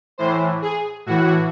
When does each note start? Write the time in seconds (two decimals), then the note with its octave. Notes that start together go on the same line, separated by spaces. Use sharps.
0.18 A2 E3 C5
0.62 G#4
1.06 A2 E3 F#4